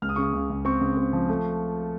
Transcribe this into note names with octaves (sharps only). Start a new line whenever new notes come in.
C#2 F6
D#6
C#3 C#6
D#6
C#2
C#2
C4 C#6
C#2
C4
F3
A3